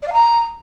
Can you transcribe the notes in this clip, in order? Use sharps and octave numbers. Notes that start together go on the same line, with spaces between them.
D5
F5
A#5